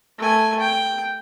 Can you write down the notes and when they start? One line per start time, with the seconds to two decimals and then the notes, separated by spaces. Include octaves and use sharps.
0.18 A3 G#5
0.60 G5